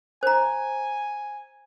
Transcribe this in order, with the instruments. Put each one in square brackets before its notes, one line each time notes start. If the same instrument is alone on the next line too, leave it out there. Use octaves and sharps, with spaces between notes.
[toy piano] C5 A#5 [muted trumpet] G#5